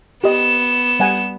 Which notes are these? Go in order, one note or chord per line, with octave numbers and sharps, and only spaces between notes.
B3 G4 D#5 E7
G3 F#5 G#5